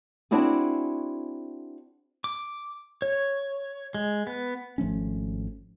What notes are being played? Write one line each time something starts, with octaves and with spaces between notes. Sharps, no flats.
C4 D4 E4 F#4 G#4
D6
C#5
G#3
B3
G#1 F3 A3 C#4